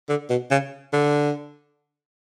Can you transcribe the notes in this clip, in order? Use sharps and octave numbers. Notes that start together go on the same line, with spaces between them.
D3
B2
C#3
D3